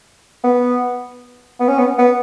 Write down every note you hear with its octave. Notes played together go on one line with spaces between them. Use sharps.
B3
B3
C#4
B3
B3